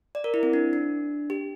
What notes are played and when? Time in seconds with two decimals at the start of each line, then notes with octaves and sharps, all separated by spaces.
0.15 D5
0.24 A#4
0.34 E4
0.43 C4
0.53 D4
0.73 D4
1.30 G4